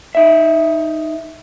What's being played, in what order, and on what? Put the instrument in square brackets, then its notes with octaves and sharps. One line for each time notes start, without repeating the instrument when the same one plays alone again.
[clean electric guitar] D#4 E5